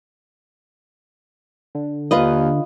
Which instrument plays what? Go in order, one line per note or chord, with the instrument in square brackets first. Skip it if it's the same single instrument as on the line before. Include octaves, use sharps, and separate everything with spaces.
[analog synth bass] D3
[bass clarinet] D#2 [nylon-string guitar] F4 B4 D#5